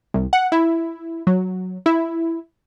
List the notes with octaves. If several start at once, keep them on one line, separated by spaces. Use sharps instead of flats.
C2
F#5
E4
F#3
E4